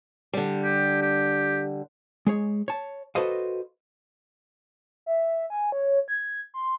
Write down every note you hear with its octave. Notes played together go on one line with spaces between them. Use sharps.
D3 G3
G4
G4
G#3 G#4 C#5
C#5 A5
F#4 A4 B4 C5 D#5 F5
E5
G#5
C#5
G#6
C6